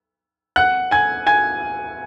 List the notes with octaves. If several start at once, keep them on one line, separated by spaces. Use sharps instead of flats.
F#5 F#6
G#5 G#6
G#5 G#6